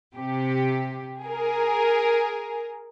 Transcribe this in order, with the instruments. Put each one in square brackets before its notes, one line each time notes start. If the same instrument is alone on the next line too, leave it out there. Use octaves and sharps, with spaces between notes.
[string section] C3 G4
G#4 A#4